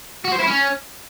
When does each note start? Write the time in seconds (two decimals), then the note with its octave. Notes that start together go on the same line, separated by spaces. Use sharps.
0.25 F#4
0.33 C5
0.40 E4
0.48 C#4